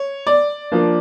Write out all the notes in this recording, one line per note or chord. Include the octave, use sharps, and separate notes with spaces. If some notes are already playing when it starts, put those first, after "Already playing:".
Already playing: C#5
D5
F3 A#3 D4